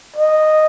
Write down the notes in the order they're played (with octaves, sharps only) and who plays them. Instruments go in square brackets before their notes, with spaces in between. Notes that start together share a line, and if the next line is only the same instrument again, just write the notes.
[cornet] D#5